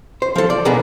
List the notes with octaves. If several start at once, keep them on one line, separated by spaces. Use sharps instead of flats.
C5
F3 A4
D5
B2 D3 A#3 B3 G#4